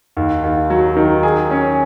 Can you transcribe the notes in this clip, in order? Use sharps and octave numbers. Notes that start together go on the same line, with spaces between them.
D#2
D#2
F#3
D#3
G#4
C#4